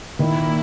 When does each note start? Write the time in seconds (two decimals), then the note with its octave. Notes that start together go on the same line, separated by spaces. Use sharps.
0.19 A#2 D#3 A#3 E4